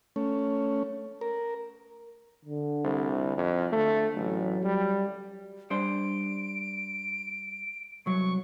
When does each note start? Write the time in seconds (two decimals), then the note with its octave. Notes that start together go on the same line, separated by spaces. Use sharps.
0.16 A3 C#4
1.21 A#4
2.45 D3
2.84 C2
3.38 F2
3.72 D3 A3
4.16 A1 F#3
4.64 G3
5.70 G3 D4 C5 D7
8.06 C2 F#3 C#6